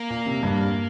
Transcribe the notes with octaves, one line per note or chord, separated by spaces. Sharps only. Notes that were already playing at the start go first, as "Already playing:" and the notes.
Already playing: A#3
A#2
C3
G2